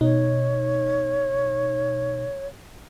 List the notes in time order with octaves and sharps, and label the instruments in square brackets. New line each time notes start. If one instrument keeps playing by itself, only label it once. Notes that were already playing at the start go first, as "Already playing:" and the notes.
[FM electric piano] B2 D#4 [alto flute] C#5